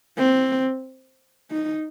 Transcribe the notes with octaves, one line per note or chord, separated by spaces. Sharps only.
C4
D#4